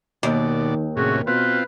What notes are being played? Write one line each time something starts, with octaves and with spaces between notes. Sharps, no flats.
D#2 B2 D#3 D5
A2 C3 C#4 F#4 G#4
B2 C4 F4 B4